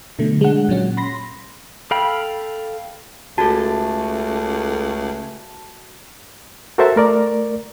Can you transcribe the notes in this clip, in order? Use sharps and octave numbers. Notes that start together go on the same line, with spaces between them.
B2 D3 F#3 A3
G#3 D4 F#5
A#2 F#3 C#4 F#5
B5 C6 A#6
A4 F5 G5 B5
C#2 A3 F#4 A4 A5
F#4 A4 A#4 C5 E5 A5
A3 A#4 D5